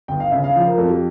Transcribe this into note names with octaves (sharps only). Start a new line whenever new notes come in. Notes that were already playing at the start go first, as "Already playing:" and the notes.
G1 G5
F5
C#3 E5
F5
F3 F5
A#4
F2 A4
G4